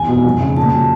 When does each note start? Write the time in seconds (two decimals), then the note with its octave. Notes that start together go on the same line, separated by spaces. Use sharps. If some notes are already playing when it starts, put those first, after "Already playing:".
Already playing: E2 C3 G#5
0.08 B2
0.25 F2
0.41 C#3
0.57 A#2 A5
0.73 F#3